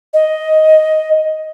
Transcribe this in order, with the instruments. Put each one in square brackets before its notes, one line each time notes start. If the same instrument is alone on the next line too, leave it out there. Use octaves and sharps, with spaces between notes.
[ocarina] D#5